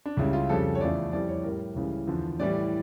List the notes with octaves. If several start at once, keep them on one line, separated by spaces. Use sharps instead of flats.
D4
C#2 C#3 G3 E4
F4
F2 C#3 G3 A4
C#5
E2 C#3 F3 A3 D5
F2 E3 G3 D5
C#5
A2 G3 A#4
C#2 C#3 E3 G3
E2 D3 F3
A2 E3 G3 D5